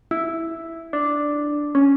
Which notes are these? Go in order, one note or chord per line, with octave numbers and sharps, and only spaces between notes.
E4
D4
C#4